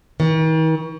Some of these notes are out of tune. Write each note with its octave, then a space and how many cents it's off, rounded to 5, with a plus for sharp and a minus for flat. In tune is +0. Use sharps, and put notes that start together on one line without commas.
D#3 +45